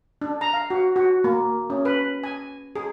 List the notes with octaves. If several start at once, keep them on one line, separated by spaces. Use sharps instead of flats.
D4
A#5
F5
F#4
F#4
A#3
C#4
B4
G#5
G#4